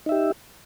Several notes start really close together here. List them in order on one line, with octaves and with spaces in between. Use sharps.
D#4 E5 G4